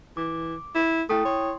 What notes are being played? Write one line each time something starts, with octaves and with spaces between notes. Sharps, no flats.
E3 D6
E4
A3 E4 G5 D#6
C#5 C6